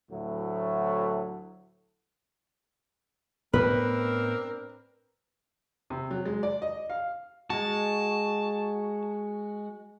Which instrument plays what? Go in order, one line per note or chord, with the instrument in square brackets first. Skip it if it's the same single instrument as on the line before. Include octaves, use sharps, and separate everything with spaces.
[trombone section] D2 A2 F#3 A3
[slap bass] A2 B3 [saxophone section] C4 D4 A#4 [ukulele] B4
[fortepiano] C3
F#3
G#3
D5
D#5
F5
[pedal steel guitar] G#3 F#4 [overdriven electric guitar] A5